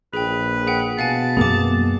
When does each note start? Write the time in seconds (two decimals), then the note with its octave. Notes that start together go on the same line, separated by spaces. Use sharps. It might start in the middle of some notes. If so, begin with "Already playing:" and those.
0.14 A#1 G#4 B4 G5
0.67 G#4 F#5 G5
0.99 B2 F5 F#5 G#5 A5
1.37 F#2 A#3 B3 G#4 D6